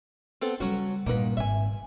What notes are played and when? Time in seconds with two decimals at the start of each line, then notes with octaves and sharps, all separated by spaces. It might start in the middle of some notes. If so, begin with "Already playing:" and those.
0.41 B3 C4 A4
0.60 C#3 F#3 G3 C#4 F#4
1.06 G2 A#2 A#3 D#4 B4
1.37 G#1 E5 G#5